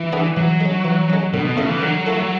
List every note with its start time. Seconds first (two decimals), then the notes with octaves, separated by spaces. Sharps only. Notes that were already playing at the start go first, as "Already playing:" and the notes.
Already playing: E3
0.12 B3 D4 G#4
0.37 E3 F#3
0.61 G#3 C#4
0.84 E3
1.10 G#3 C#4
1.33 B2 D3
1.45 B2
1.57 C#3 A3 E4 A4
1.69 E3
1.82 D3 F#3
2.07 A3 E4 A4